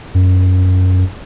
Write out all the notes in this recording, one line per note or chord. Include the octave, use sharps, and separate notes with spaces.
F#2